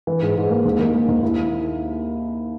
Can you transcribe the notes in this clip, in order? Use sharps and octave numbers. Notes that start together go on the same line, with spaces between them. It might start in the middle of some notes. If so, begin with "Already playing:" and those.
E3
G#2
G#2
A#3
D#2
D#3
A#3
D#2
E4